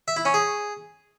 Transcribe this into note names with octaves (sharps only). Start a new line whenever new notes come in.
E5
E4
C#4
G#4